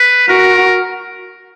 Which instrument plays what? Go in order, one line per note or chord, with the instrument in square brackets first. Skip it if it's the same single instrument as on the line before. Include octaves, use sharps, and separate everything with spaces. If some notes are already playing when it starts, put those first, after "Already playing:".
Already playing: [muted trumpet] B4
[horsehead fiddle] F#4 [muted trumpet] A#4